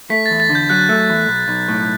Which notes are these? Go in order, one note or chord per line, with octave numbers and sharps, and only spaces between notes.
A3 B6
E2 A6
A6
D3
G6
F#3 F#6
A3
E2
B1
B1
A2